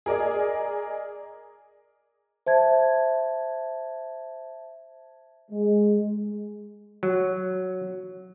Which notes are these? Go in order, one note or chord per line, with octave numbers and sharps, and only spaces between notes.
G#4 A#4 D5 D#5
C5 E5 A5 G#6
G#3
F#3